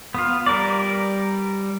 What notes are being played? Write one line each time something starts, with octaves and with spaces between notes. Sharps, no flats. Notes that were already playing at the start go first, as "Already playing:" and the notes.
B3 F4
G3 A#4 B4 D5